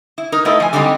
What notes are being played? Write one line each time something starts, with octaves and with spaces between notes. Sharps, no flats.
E4
D#4 A#4
A3 B3 D#4 E4 A4 D#5
F3 G#5
D3 G3 G#3 C4 D#4 G4